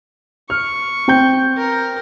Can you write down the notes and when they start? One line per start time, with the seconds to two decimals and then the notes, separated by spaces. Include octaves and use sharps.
0.50 C#6 F6
1.08 C4 G5 G6
1.57 A#4